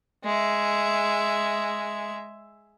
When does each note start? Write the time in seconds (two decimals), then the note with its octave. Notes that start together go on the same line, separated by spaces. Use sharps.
0.24 G#3 E5